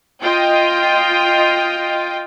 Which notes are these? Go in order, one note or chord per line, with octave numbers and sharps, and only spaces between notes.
F4 D#5 G5